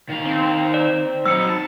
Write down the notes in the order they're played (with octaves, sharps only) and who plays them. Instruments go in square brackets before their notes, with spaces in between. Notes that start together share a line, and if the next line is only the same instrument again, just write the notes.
[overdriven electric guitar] D#3 F5
[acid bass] C4
[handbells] D5
[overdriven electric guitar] F#3 D#4 [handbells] E6 C#7
[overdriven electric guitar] A5